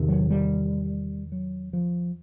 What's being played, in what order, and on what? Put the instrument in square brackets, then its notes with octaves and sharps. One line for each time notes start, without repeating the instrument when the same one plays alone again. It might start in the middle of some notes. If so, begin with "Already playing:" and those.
Already playing: [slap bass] E2 C3 D#3
[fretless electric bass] F#3
G3
F#3
F3